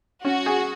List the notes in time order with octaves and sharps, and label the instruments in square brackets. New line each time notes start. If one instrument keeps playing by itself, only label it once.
[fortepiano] C#4 [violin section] F#4
[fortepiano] G#4